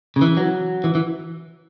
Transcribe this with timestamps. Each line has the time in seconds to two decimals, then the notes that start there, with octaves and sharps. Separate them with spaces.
0.16 C#3
0.21 E3
0.37 F#3
0.84 E3
0.95 E3